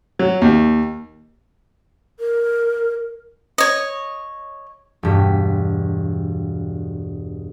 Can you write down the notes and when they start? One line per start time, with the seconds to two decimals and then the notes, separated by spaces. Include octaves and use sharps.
0.19 F#3
0.42 D#2
2.20 A#4
3.58 C#5 D#5
5.03 E1 G2 B6